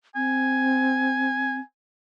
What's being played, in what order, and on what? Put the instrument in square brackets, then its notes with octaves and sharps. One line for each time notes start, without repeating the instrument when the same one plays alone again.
[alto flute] C4 [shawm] G#5